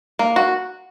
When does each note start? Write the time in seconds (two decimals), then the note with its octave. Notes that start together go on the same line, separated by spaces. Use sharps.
0.19 A#3
0.36 F#4